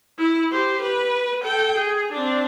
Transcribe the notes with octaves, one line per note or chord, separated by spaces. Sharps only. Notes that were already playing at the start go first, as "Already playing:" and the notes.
E4
G4 C5
B4
A4 G5
G#4
C4 D4